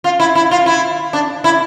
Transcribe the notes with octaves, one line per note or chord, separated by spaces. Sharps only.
F4
E4
E4
F4
E4
D4
E4